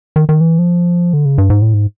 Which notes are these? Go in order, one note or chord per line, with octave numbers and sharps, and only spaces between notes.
D#3
D#3
E3
F3
D3
C#3
G2
G#2
A2
G#2